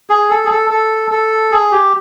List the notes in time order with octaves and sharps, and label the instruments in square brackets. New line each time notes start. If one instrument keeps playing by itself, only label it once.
[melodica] G#4
A4
G#4
A4
A4
A4
G#4
G4